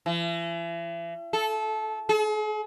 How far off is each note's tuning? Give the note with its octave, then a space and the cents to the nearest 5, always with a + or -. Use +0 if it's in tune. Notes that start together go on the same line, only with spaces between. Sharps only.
E3 +40
A4 -20
G#4 +45